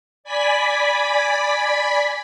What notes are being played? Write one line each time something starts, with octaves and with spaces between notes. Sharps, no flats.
D5 G#5 B5 B6